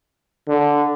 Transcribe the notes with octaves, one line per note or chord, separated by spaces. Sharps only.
D3